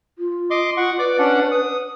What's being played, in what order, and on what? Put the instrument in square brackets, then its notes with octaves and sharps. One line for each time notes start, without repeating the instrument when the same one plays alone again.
[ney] F4
[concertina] D#5 C6 D6
[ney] F4 [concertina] F#5 C#6
[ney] B4 [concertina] D5 D6
[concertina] C#4 D4 F#5
D#6